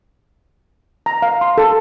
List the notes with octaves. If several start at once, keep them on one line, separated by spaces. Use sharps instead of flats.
A#5
F5
C6
A4